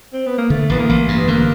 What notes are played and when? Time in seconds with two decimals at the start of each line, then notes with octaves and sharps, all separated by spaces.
0.13 C4
0.27 B3
0.38 A#3
0.50 D3 A3
0.70 A1 B3
0.79 A#3
0.89 A1
1.08 G2 A#3
1.19 B3
1.28 D3 A#3